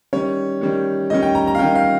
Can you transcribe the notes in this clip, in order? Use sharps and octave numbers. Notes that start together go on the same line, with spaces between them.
D#3 G3 C#4 C#5
D#3 G3 C#4
D#3 G3 C#4 D#5
G5
A#5
A#5
F5
D#3 G3 C#4 G5
F5